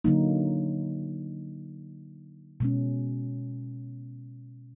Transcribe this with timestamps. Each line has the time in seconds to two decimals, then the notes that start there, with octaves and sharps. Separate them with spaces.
0.04 D3 F#3 A#3 D#4
2.60 B2 G#3 C#4